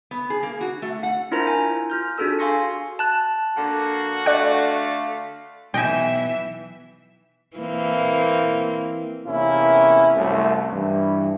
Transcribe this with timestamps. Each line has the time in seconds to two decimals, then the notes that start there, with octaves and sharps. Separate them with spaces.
0.11 B3
0.30 G#4
0.43 A#3
0.61 F#4
0.82 A3
1.03 F#5
1.31 D4 E4 F4 A#4 C5 A#5
1.47 G#5 A#5
1.90 F4 F6 G6
2.18 D4 F#4 G#4 A4 E6
2.39 F5 G#5 C6 C#6 A#6 C#7
2.99 A5 F#6
3.56 D3 A#3 F#4 F#5
4.26 D3 A3 D5 F5 F#5
5.74 B1 E3 E5 G5 G#5
7.57 E3 A#3 C4
9.26 E2 C3 A#3 C#4 E4
10.15 C2 F#2 F#3 A3
10.73 G2 E3